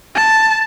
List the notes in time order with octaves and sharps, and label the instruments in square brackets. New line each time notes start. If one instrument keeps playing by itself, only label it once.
[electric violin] A5